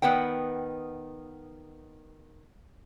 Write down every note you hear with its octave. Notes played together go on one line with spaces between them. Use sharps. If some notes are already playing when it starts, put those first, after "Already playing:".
D#3 B3 B4 F#5 G5